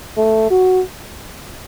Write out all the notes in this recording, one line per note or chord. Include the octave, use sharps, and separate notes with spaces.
A3
F#4